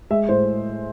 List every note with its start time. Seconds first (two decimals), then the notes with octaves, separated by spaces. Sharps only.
0.10 G#3 E5
0.29 A2 C5